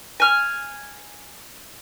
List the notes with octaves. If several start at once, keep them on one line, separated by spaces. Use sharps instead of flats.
G#5 F6